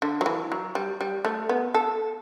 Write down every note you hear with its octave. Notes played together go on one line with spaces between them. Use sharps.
D3
F#3
E3
F#3
G3
G3
A3
B3
A4